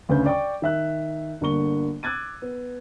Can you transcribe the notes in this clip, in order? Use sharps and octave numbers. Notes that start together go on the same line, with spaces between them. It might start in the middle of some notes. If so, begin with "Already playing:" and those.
D2 C#3 B4 G6
D5 G5 C#6 D6
D#3 E5 F#6
G1 D3 A#3 C#6 G7
D6 E6 F#6 G#6 A6 D#7
B3